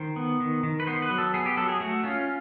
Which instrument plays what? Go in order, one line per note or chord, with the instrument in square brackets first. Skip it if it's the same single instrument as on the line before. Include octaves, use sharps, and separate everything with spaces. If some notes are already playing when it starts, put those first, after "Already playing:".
Already playing: [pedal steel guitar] D#3 C5
B3
D#3
D#3
B4
B3 C5
B4
F#3
A4
B3 G#4
G4
F#3 A4
G#4
A3 F#4
C#4 F4